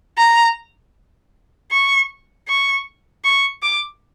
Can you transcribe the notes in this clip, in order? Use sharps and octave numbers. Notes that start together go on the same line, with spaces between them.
A#5
C#6
C#6
C#6
D6